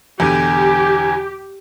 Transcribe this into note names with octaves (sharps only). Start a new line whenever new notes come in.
E2 B2 D3 G4 G#5